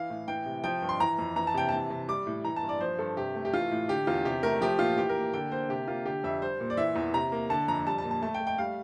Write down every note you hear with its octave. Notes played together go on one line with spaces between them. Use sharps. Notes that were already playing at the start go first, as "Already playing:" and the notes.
Already playing: E3 F5
A2
E3 G5
C3
F3 G5
G2
C6
E3 A#5
F2
E3 A#5
A5
C3 G5
E3 A5
C3
G3 D6
A2
E3 A#5
A5
G2
D5
F3 C5
G2 A4
C3 G4
A3
G4
E3 F4
A2
D3 G4
E2 F4
C3 G4
A3 A#4
F3 G4
A#2 F4
E3 G4
A#4
A#3
D3 G5
A#3 C5
C3 G4
A#3 F4
D3 G4
F2 E5
G3 C5
A#2
D5
E3 E5
E2
C3 A#5
A#3
D3 A5
F2 A#5
G3 A5
A5
A#2
A5
A3 A5
G5
A3
G5
G3 F5